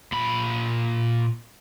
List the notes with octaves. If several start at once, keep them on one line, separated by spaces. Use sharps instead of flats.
A#2 B5